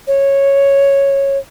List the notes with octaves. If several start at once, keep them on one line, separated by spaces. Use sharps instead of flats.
C#5